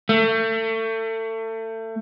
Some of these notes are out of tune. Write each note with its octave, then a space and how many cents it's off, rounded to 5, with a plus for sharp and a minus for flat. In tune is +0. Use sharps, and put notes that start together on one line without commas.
A3 +30